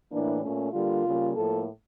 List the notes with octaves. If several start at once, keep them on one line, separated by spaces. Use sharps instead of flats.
A2 E3 A#3 D4
A#2 A3 C#4
D3 G3 A#3 F4
C#3 G3 A#3
A2 F3 A#3 A4